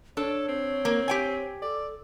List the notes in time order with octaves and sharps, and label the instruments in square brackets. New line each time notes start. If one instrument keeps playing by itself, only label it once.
[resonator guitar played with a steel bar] D4 [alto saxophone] A4 [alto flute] C#5
[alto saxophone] C4
[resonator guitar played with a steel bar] A#3
G4 G5 G#5
[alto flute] A4 [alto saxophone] D5